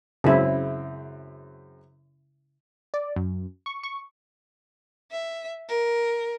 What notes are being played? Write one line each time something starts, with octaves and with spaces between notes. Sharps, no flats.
F#2 C#3 G#3 C4 E4
D5
F#2
C#6
C#6
E5
A#4